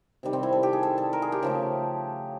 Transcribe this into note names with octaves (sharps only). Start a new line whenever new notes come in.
C3 D#3 G3
C4
E4
A4
G4
G#4
A4
A4
A#4
G#4
G4
C#3 F3 A3